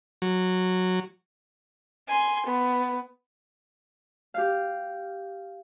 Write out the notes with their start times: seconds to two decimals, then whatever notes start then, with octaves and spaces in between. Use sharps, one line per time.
0.22 F#3
2.08 G#5 C6
2.46 B3
4.34 G4 F5